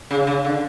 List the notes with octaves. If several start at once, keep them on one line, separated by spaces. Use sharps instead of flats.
C#3
C#3
D3